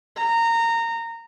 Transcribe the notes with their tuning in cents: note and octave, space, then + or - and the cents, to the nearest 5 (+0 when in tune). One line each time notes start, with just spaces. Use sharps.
A#5 -20